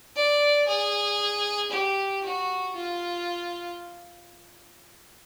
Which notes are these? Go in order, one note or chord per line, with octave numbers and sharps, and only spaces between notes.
D5
G#4
G4
F#4
F4